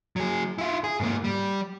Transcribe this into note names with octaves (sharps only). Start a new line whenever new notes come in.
F#3 G#4
E4 F4
G#4
G#2 A#3
G3